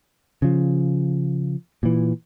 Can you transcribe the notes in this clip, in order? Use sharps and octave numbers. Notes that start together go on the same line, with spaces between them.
C#3 F3
A#2 E3